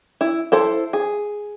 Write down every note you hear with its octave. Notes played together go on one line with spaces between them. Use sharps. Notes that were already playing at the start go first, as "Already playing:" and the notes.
E4
E4 A4 C5
G#4